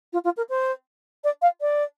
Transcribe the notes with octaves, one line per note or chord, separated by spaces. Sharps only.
F4
F4
A#4
C5
D5
F5
D5